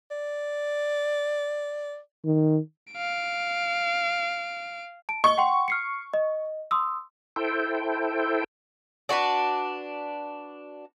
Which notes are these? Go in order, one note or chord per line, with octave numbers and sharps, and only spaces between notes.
D5
D#3
F5 D7
A5 D7
D#5 C#6 G7
F#5 G5 C6
F6 C7 C#7
D#5
C6 D#6 E6
E4 A4 C5 G5
D4 F#4 G#4 B4